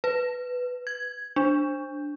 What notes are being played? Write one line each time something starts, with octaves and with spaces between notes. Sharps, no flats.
B4
G#6
D4